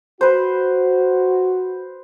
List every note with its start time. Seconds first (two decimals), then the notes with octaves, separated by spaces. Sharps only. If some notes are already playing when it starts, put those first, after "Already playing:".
0.21 F#4 B4 C5